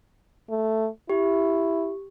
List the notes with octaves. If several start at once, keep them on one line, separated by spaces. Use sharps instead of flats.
A3
E4 G4